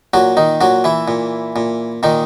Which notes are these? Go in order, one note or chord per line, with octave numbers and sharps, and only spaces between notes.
A#2 F#3 F#4
D#3 D#4
A#2 F#3 F#4
E3 E4
A#2
A#2
A#2 D#3 D#4